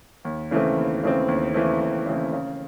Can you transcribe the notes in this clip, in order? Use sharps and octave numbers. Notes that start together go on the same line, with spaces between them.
D#2
C#3 E3 A3 C4
D#2
C#3 E3 A3 C4
D#2
C#3 E3 A3 C4
D#2
C#3 E3 A3 C4
C#3